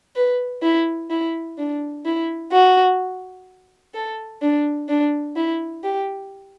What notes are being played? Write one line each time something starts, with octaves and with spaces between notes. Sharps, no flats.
B4
E4
E4
D4
E4
F#4
A4
D4
D4
E4
G4